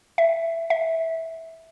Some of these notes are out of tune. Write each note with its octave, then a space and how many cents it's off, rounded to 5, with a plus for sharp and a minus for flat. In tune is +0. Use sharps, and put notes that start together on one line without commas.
E5 +10
E5 -15